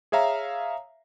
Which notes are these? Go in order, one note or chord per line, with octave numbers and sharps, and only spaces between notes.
G#4 C#5 E5 F5 A#5